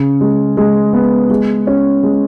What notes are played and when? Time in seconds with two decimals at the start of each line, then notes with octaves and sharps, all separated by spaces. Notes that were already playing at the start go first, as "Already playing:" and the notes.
Already playing: C#3
0.21 G#3
0.57 G#3
0.93 B3
1.30 G#3
1.67 C#4
2.03 G#3